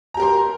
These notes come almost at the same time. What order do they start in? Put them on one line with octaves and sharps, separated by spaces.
A#5 G4 A#4 C6